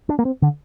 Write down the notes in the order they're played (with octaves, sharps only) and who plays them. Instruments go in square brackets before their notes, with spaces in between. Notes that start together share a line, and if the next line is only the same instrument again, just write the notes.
[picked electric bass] D4
A#3
C4
D3